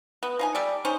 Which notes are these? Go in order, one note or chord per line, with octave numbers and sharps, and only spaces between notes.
B3
F3 D#4 G#5
G3 A4 D5
C#4 D#4 C5